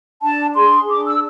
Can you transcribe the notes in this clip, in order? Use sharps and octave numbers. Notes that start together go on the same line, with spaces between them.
D4 A5
G#4 C6
D4 D6
E6